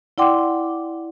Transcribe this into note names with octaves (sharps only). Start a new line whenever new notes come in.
E4 D5 F#5 G5 C6 D6